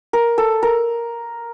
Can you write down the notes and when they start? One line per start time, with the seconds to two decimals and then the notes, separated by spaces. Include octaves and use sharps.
0.13 A#4
0.38 A4
0.63 A#4